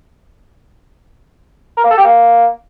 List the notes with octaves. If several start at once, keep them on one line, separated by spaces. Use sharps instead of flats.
A#4
A#3
A4
G4
A#3